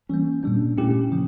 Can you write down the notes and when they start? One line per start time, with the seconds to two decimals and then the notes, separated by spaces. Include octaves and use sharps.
0.09 E3 G3 A#3 C#4
0.43 A#2 G3 A#3 D4
0.77 A#2 A3 C#4 E4 G4
1.12 C#3 F3 A#3